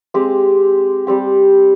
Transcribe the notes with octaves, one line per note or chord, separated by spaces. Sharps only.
G#3 C4 G4
G3 C4 G4